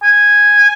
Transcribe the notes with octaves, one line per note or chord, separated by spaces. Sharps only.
G#5